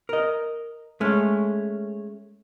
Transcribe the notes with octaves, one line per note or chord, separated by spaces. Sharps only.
A#4 D#5
G#3 A3 C#4